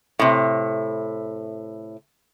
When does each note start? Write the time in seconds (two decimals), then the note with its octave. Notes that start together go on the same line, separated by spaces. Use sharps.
0.19 A2 C3